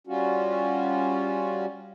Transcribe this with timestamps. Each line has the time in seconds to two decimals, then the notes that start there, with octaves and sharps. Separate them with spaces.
0.07 G3 C#4 F4 F#4